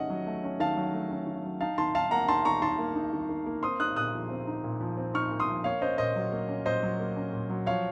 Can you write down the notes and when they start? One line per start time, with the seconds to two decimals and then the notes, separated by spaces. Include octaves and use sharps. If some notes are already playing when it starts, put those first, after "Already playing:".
Already playing: D#3 A3 C#4 D#5 F#5
0.10 F#3
0.27 A3
0.43 C#4
0.60 D#3 F5 A5
0.77 F#3
0.94 A3
1.10 C#4
1.27 D#3
1.44 F#3
1.61 D#4 F5 A5
1.78 D#3 A5 C6
1.95 D#3 F5 A5
2.11 A#3 F#5 A#5
2.28 D#4 A5 C6
2.45 D#3 A#5 C#6
2.62 D#3 A5 C6
2.79 A#3
2.95 D#4
3.13 D#3
3.29 D#3
3.46 A#3
3.63 C4 C6 D#6
3.80 D#4 D#6 F#6
3.96 A#2 D#6 F#6
4.14 F3
4.30 C4
4.47 D#4
4.64 A#2
4.81 F3
4.97 C4
5.14 D#4 C#6 F6
5.31 A#2
5.40 C6 D#6
5.48 F3
5.64 A#3 C#5 F5
5.81 C#4 C5 D#5
5.98 A#2 C5 D#5
6.16 F#3
6.32 A#3
6.49 C#4
6.66 A#2 C5 D#5
6.83 F#3
7.00 A#3
7.16 C#4
7.33 A#2
7.50 F#3
7.66 F3 C#5 F5